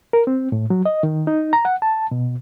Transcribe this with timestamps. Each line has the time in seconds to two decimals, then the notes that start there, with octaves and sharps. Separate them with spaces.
0.13 A#4
0.27 C4
0.52 A2
0.70 F#3
0.85 D#5
1.03 D#3
1.27 D#4
1.53 A#5
1.65 F#5
1.82 A5
2.11 B2